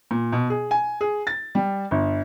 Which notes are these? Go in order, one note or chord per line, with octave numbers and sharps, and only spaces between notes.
A#2
B2
G#4
G#5
G#4
A6
G3
G1